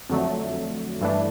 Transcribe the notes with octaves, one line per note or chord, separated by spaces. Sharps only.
F2 D3 F#3 A3
G2 E3 A3 D4